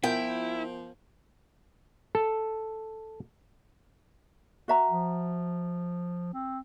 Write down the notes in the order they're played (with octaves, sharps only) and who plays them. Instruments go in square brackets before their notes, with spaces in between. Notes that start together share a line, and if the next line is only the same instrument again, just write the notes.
[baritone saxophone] F3 [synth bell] B3 A#4 [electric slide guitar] E4 [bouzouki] G5
[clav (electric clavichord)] A4
[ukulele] F#4 E5 A#5
[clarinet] F3
C4